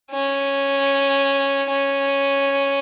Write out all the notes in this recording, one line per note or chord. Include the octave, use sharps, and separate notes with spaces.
C#4
C#4